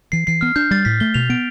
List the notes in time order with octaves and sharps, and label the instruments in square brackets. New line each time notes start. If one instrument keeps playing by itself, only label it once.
[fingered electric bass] E3 [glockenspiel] C7
[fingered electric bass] E3 [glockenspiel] C7
[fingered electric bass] B3 [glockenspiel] F6
[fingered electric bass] D4 [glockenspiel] G6
[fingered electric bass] G3 [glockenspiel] A6
[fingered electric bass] A2 [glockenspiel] B6
[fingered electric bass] A3 [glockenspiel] G7
[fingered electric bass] B2 [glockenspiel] F7
[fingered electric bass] B3 [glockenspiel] D7